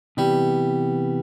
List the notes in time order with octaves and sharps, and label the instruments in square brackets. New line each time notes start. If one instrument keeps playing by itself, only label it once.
[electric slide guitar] C3 E3 B3 [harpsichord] G3